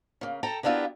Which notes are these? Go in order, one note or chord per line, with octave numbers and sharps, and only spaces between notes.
C#3 A#3
A4 G5 A5 A#5
A#3 B3 D4 E4 F4 G4